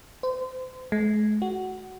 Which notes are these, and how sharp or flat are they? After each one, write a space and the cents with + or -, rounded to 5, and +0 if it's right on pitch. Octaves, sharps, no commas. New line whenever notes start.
C5 -30
G#3 +40
F#4 +10